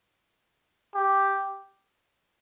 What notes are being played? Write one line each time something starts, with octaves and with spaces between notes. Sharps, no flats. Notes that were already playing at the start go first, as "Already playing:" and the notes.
G4